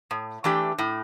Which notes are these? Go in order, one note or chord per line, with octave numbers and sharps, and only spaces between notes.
A2
E3 A3 D4 G4
A2